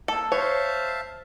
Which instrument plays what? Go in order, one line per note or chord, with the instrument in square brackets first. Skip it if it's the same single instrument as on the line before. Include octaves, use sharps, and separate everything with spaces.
[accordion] A#3 [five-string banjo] A4
[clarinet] C5 [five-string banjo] C#5 [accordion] E5 F5 A5